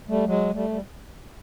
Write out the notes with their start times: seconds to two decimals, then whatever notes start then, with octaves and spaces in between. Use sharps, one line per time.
0.09 G3 A3
0.27 F#3 G#3
0.54 G3 A3
0.70 G3